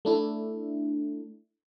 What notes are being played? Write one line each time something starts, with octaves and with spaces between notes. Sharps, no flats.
A3 D4 E4